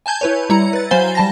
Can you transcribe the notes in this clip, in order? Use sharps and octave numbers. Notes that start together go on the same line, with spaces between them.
G#5 A5 G6 G#6
E4 B4 C#5
G3 E4 A#5 C#7
B4 A6
F#3 C5 F5 G#5 B5 G7
G3 A5 A#6